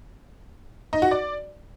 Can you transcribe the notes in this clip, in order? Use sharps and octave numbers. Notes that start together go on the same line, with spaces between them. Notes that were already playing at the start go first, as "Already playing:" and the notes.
D#4
F#4
D5